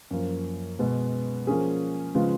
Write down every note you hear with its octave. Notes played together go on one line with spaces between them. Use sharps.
F#2 F3 A#3
B2 G#3 B3
F3 A#3 C#4 G#4
C#3 F3 G#3 B3 F4